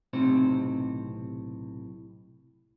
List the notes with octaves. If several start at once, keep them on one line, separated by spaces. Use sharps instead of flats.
B1 A2 C3 C4 D#4 C5